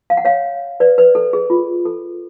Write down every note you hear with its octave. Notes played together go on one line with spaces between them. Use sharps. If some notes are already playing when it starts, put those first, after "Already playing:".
F5
F#5
C#5 F5
B4 D5
B4
A4
G#4
F4
A4